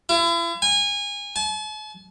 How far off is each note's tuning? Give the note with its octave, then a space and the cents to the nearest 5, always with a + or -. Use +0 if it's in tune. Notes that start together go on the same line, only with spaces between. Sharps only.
E4 +40
G#5 -25
A5 -45